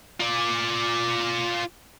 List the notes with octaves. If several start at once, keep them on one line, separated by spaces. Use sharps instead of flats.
F4 D5